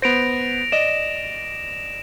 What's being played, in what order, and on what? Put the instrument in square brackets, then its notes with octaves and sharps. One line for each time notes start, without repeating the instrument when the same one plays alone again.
[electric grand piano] B3 C5 [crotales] A#6 D7 F7
[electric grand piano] D5 D#5 [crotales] E7